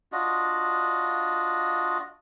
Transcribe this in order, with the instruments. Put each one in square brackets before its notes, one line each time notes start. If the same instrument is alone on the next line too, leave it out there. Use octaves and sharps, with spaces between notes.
[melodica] D4 F4 F#4 D#5